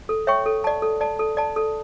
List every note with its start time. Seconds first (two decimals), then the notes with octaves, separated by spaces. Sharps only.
0.09 A4
0.27 C#5 E5 G5 C#6
0.46 A4
0.64 D5 A5
0.82 A4
1.01 D5 A5
1.19 A4
1.37 D5 A5
1.56 A4